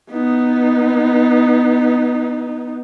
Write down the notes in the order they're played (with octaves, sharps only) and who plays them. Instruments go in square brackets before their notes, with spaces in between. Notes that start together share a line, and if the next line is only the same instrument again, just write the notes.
[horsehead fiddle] B3 D#4